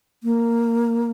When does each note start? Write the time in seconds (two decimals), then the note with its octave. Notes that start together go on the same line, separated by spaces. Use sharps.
0.23 A#3